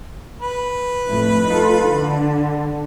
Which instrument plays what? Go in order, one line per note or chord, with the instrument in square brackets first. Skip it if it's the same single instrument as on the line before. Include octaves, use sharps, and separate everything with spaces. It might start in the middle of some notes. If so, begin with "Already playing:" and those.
[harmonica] B4
[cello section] F2 A2 E4
D#4 F4 A4
D3